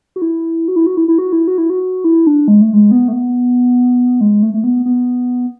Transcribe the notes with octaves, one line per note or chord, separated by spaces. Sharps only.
F#4
E4
F#4
E4
F#4
E4
E4
F#4
E4
F#4
E4
F#4
E4
D4
G#3
A3
G#3
B3
A3
B3
G#3
A3
A3
B3
B3